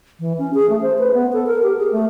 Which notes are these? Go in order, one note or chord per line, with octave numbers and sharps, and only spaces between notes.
E3
C#4
G#4
A3
C5
B4
B3
A4
A#4
G4
G#4
A3